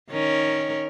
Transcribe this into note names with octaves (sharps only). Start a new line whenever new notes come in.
D#3 C#4 A#4